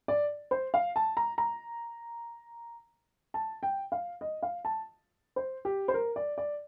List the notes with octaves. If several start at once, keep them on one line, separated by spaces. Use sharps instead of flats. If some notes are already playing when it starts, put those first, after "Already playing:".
D5
C5
F5
A5
A#5
A#5
A5
G5
F5
D#5
F5
A5
C5
G4
C5
A#4
D5
D5